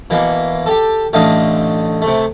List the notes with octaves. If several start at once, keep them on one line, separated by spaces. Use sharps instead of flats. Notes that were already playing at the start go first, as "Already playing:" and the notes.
B2 E3 A#3
G4 A4
A1 D3 A3 D#5 F5
C3 A3